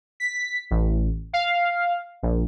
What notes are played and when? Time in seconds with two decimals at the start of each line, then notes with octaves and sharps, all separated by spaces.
0.20 B6
0.71 A1
1.33 F5
2.23 A#1